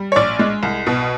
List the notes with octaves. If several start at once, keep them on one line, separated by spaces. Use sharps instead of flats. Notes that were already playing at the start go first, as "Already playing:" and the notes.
Already playing: G3
C#5
A#1 D5
G#3
C2
B2